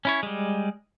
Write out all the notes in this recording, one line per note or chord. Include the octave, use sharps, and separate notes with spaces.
C#4 E4 C#5
G3 G#3